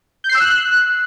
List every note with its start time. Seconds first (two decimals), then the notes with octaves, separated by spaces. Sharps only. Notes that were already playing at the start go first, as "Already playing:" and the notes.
0.24 G6
0.29 C7
0.35 E6
0.40 F#6